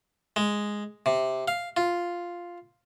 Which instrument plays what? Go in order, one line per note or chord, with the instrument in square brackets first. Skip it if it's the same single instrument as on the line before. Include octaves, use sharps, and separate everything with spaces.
[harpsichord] G#3
C3
F5
F4